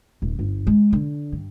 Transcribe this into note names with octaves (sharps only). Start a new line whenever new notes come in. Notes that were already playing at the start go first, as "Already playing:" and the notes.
D#1
G1
G#3
D3
G2